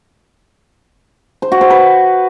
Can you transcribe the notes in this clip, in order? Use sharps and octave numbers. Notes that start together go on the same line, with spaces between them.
C5
F#4
C5
B4